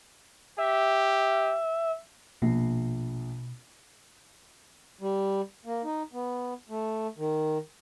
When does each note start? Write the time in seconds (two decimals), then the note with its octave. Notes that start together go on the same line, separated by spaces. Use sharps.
0.58 G4 E5
2.42 A#1 B2
5.01 G3
5.66 A#3
5.84 D#4
6.13 B3
6.69 A3
7.18 D#3